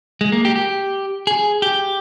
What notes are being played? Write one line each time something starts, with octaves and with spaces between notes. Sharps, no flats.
G#3
A#3
G4
G4
G#4
G4